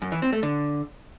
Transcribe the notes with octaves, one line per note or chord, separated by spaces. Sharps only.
F#2
E3
C4
A3
D3